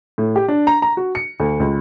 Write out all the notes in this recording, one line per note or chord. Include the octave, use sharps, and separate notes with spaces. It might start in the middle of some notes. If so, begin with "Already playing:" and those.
A2
G4
D4
A#5
A#5
F#4
C#7
D2
C#2